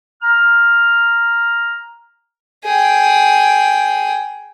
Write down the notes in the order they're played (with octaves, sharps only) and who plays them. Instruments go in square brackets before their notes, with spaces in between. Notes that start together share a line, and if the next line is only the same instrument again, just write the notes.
[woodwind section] A#5 F6
[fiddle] G#4 G5